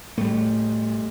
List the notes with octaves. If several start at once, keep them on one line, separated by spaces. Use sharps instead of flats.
A2 G3 A3